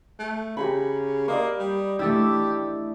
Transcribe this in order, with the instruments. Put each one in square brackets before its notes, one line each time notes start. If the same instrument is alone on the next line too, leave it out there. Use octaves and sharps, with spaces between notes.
[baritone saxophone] A3
[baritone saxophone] C#3 [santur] G4 A#5 B5
[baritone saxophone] A#3 [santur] D5 D#5 D6
[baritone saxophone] G3
[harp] A3 D4 E4 [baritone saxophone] G4